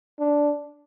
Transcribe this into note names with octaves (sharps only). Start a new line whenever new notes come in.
D4